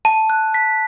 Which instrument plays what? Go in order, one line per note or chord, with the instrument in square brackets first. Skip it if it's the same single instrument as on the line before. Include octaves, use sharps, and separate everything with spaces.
[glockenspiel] A5
F#6
B6